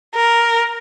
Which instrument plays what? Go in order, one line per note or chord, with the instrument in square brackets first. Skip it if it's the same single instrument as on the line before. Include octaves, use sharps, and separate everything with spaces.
[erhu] A#4